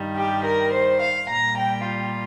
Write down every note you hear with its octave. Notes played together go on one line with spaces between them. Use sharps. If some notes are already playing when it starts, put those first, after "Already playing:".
Already playing: G2 D#3 G3
G4
A#4
C5
F5
A#2 G3 A#5
G5
F4